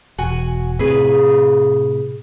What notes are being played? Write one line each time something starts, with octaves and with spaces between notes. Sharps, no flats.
E1 F#4 G#5
A2 C3 G#4 B4